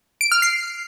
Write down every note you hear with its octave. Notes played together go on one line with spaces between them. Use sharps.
D7
F6
C7